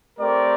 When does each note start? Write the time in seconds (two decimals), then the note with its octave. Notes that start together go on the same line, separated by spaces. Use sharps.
0.18 A3 C4 G4 A#4 D5